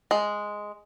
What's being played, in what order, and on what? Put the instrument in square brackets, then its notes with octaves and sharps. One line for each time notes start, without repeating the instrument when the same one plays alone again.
[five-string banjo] G#3